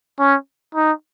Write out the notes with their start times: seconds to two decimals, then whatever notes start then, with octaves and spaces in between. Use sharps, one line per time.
0.19 C#4
0.75 D#4